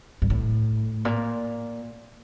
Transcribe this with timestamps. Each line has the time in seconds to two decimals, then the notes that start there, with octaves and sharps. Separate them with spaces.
0.22 G2
0.30 A2
1.05 A#2